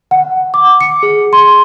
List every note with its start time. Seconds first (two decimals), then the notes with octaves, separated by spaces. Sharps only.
0.11 F#5
0.54 D6
0.81 C#7
1.03 G#4
1.33 C6